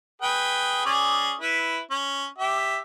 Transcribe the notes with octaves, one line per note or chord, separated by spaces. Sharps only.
G#4 B4 G5
C#4 G#4 D5
E4 B4
C#4
G4 E5